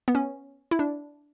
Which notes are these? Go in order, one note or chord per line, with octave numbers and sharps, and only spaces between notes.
B3
C#4
E4
D4